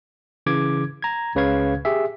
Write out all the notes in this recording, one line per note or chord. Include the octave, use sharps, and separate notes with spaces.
C#3 E3 D6 G#6
A#5 G#6
C#2 C#3 B4 C#5 F5 G#6
G4 G#4 E5